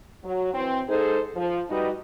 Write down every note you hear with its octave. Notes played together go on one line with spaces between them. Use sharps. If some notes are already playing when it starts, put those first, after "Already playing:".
F#3
E3 C4
G#2 D#4 G#4 A4 C5
F3
G3 D#4 F#4 B4 D#5